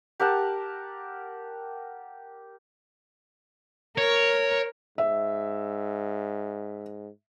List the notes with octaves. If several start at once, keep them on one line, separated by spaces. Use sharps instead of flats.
G4 A#4 F#5 A5
A#4 C#5
G#2 E5